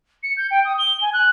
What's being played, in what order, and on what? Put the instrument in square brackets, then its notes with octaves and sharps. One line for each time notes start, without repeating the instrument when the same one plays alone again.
[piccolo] C#7
G6
G5
D#6
G7
G#5
F#6